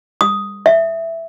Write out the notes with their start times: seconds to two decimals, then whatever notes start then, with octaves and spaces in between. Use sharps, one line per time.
0.21 D#6
0.66 E5